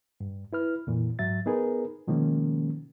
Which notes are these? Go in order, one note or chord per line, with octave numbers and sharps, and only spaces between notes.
G2
E4 B4 F6
F2 A#2 E3
G#2 F#3 E5 A6
B3 D#4 G#4 A#4 B4
B2 D#3 F3 G#3 A#3 C#4